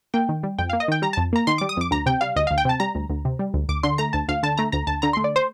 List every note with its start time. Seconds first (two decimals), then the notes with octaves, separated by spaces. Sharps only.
0.14 A#3 G5
0.29 D#3
0.43 G3
0.59 F2 G5
0.70 A#3 F5
0.80 D#5
0.88 D#3 G5
1.02 G3 A#5
1.13 F2 A5
1.33 A#3 A#5
1.47 D#3 C6
1.58 G3 D6
1.69 D#6
1.77 F2 D6
1.91 D2 A#5
2.06 C3 G5
2.21 G3 F5
2.36 D2 D#5
2.47 D2 F5
2.58 G5
2.65 C3 A5
2.80 G3 A#5
2.95 D2
3.10 D2
3.25 C3
3.39 G3
3.54 D2
3.69 D2 D6
3.83 D3 C6
3.98 A3 A#5
4.13 D2 A5
4.28 D2 F5
4.43 D3 A5
4.57 A3 A#5
4.72 D2 A#5
4.87 D2 A5
5.02 D3 A#5
5.13 A3 C6
5.24 D5
5.36 C5